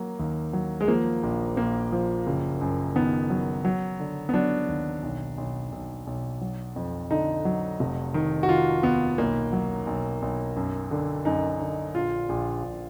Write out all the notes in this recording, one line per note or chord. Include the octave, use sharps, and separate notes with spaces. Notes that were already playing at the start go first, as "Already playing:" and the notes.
Already playing: F#3 A#3
D#2
F#3
G#3
F3 A#3
A#1
A#1 A#3
F3
F#1
F#2
D#3 B3
F#3
F#3
D3
B3
F#3 D4
D#2
B1
B1
B1
B1
F#3
F2
D3 D#4
F#3
F1
D#3
F#4
D#3 F4
D#2 B3
B1 A#3
F#3
B1
B1
F#2
D3
F#2 D#4
D3
A#1 F4
A#1
A#1